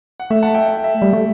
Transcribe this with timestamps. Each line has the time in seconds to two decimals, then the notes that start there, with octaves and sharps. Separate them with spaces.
0.20 F#5
0.31 A3 E5
0.42 F#5 A5
0.54 E5 G5
0.66 E5
0.84 E5
1.02 G3
1.13 A3